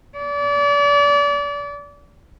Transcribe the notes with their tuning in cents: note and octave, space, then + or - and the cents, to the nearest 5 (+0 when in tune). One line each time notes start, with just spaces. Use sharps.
D5 -35